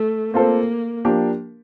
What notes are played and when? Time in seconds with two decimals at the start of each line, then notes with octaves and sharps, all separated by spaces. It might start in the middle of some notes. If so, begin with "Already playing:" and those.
Already playing: A3
0.34 A#3 C4 F4 A4 C5
1.05 F3 A#3 D4 G4